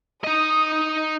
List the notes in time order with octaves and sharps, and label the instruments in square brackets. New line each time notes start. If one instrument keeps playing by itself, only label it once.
[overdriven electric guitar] D#4 D#5 [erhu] D#6